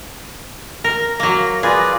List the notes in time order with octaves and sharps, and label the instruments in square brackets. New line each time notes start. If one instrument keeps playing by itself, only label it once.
[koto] A#4 [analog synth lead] A#6
[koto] F#3 A#3
[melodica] F4 B4 D5 [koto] G#4